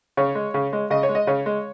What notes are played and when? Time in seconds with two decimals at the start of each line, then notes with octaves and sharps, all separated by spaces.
0.17 C#3 C#5
0.35 G#3
0.54 C#3
0.73 G#3
0.90 C#3 D#5
1.03 C#5
1.09 G#3
1.15 D#5
1.27 C#3 C#5
1.46 G#3